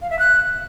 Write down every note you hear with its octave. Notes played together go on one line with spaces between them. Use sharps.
F5
E5
F#6